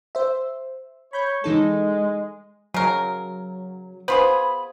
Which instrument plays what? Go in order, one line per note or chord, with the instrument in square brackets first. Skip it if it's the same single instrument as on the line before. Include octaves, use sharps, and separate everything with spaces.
[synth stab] C5 E5
[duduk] C#5 [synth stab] B5 G6
[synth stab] E3 D#4 A4 [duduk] G#3
[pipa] C#3 A#4 [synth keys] F#3
[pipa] B3 F4 G#4 [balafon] C5 [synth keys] B5